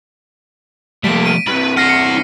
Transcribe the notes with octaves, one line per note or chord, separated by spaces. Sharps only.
F3 G3 A3 A#3 B6 D7
D#7
G2 C3 B4 B5
E4 F#5 F6 A#6 C7
C#7